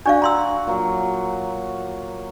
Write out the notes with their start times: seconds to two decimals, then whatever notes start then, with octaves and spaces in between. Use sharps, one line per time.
0.06 D4 F#4 D5 F5
0.22 A#5 C6 E6
0.67 A#2 F#3